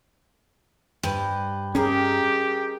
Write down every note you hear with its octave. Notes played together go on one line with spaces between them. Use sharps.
G2 B4 C5
C#4 G4 G#4 A#4 D#5